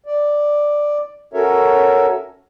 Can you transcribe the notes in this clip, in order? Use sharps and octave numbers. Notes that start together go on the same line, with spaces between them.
D5
C#4 F#4 A4 A#4 C#5 E5